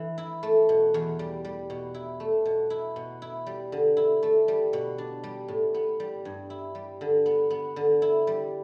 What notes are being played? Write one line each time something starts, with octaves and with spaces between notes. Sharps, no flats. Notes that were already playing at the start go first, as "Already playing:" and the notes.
Already playing: E3
E4
A3
B2
E2
G3
G3
B2
E4
A3
B2
E4
B2
E4
G3
D3
E4
A3
G3
B2
D4
G3
A2
B3
G3
G2
E4
G3
D3
B3
B3
D3
E4
G3